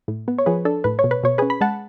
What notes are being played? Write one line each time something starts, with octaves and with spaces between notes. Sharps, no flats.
A2
B3
C#5
F3 G#4 B4
D4 A4
A2 B4
C#5
B2
B4
B2 C#5
C#4 G#4 B4
B5
G#3 F#5 A5